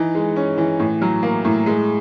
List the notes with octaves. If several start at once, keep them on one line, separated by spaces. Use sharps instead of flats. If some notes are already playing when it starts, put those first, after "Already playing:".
Already playing: E3 D#4
G#3
C#4
E3
A2
F#3
A#3
A2
G#3